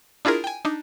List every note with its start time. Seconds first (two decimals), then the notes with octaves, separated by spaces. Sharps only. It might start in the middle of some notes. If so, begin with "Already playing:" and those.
0.25 D4 E4 F4 G#4 A#4
0.44 G5 G#5
0.65 D4 D#4